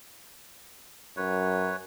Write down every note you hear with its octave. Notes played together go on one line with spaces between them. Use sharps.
F#2 B4 C#5